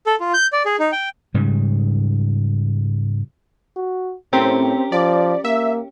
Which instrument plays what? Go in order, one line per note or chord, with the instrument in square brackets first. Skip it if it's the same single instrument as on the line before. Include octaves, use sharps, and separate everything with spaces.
[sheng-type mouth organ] A4
F4
G6
D5
G#4
D#4
G5
[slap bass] G#2 C#3 G3
[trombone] F#4
[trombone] A2 [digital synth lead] C4 [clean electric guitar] C#4 G4 A#4
[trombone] F3 [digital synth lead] D5
[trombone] A#3 [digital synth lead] E5